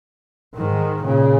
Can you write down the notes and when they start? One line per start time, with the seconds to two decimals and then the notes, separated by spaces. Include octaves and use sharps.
0.55 G#2 D#3
1.04 A#2 C#3